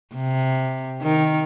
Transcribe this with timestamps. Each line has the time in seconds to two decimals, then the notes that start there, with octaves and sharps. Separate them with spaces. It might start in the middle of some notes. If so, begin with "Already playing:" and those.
0.15 C3
1.02 D#3